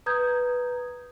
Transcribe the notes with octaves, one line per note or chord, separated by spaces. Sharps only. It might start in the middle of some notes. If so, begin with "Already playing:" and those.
B4 A#5 D#6 G6 G#6